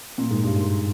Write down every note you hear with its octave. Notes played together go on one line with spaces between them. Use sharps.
A#2
G#2
G2
G#2